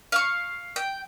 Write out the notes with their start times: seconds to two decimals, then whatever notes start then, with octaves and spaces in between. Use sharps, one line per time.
0.12 F5 C#6
0.76 G5